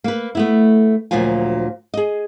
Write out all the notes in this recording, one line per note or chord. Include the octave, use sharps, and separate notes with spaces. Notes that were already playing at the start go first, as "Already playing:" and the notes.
A#3 B4
A3 B3 E4
D2 A#2 F3 F#3 F4 G#5
G#4 D#5